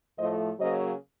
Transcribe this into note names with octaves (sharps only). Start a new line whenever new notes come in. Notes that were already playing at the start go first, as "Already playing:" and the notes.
A2 F3 A3 C5 D#5
C#3 F#3 A#3 C#4 C5 D#5